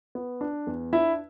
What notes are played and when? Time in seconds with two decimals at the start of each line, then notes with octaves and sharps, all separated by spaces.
0.15 B3
0.41 D4
0.67 E2
0.93 D4 E4 E5